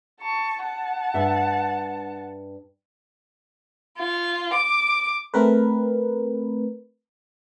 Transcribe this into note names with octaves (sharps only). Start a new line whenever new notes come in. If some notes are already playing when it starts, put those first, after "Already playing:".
A5 C#6
F#5 A5
G2 E5
F4
D6
A3 C4 A#4 B4